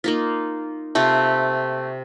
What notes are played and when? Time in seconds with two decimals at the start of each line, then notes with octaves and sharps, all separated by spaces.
0.04 A#3 D#4 F4
0.95 C3 A3 C4 F4